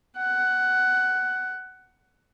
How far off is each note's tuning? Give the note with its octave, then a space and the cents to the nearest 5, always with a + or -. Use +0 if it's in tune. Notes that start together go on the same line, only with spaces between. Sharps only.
F#5 +10